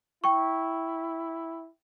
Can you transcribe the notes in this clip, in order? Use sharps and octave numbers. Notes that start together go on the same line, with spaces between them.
E4 G5 C#6